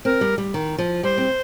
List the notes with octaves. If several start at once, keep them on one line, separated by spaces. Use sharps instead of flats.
C4 A#4
G3
G3
D#3
F3
G3 C5
C4